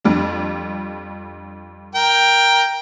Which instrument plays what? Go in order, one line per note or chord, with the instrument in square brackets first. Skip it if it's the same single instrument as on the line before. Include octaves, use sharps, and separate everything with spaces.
[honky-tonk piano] F2 G3 D4
[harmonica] A#4 G5